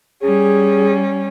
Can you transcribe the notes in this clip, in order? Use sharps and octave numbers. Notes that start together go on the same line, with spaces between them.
G3 C#4 G#4